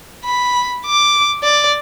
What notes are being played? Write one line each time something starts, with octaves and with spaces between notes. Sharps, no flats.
B5
D6
D5